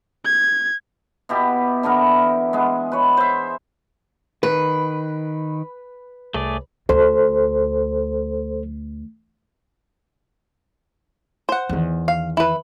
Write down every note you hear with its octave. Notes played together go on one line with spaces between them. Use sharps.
G#6
B2 E4 G4
D3 E3 B3 A#4
G#3 B3
B4 C#5
C5 E5
D#3 B4
C2 A3 G#4 D5
D2 A4 C5
C5 F#5
E2 D#3
F5
E4 B4